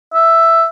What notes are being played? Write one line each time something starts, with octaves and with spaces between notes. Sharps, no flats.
E5